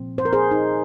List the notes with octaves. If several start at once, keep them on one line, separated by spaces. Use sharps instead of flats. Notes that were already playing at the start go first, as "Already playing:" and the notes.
Already playing: A#2 F3 C4
C5
A#4
G#4 C5
D#4